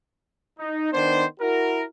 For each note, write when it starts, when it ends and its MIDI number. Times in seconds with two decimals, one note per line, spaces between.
0.59 0.88 63
0.92 1.24 51
0.92 1.24 59
0.92 1.24 62
0.92 1.24 72
1.40 1.84 64
1.40 1.84 66
1.40 1.84 70